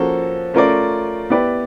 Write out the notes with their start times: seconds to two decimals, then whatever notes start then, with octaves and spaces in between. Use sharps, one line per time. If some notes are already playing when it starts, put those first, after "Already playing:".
Already playing: F3 A#3 C#4 F#4 A4
0.54 A3 C#4 F4 A#4 D5
1.30 B3 E4 G4 B4 D5